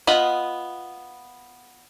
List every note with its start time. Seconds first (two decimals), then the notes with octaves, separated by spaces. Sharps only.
0.07 B3 F4 D#5 F#5 B5